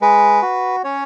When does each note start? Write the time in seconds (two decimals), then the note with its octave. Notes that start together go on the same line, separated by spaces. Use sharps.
0.01 G#3 B4
0.42 F#4
0.84 C#4 C#5